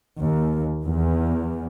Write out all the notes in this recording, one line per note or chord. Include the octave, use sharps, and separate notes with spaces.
D#2
E2